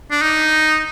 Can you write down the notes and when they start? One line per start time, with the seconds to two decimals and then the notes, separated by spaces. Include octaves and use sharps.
0.11 D4
0.22 D#4